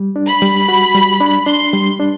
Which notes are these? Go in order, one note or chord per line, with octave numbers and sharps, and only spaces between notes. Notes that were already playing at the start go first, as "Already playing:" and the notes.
Already playing: G3
D4
B5
G3
F#4
G3
D4
D4 C6
G3
D4